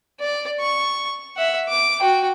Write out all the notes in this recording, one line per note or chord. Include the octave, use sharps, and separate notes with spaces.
D5
C#6
E5 F#5
D6
F#4 G5